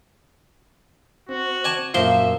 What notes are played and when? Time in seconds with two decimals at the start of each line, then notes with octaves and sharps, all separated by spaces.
1.29 C4 F#4
1.64 D5 G#5 A5
1.94 F#2 A#2 F3 A#3 C5 E5 C6